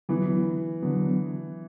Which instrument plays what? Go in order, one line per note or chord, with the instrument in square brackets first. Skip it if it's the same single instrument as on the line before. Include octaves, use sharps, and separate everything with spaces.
[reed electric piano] D3 F#3 B3 [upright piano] E3
[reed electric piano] D3 F#3 B3